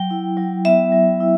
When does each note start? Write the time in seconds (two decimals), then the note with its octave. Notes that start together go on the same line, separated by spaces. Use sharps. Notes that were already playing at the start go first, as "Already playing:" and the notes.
Already playing: F#3 G5
0.11 E4
0.37 F#3
0.65 B3 E5
0.92 F#3
1.21 E4